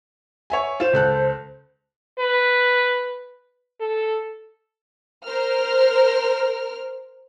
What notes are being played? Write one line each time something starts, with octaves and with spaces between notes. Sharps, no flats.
C#5 E5 G#5
F4 C5 E7
C#2 A4 F#6
B4
A4
A#4 C5 F6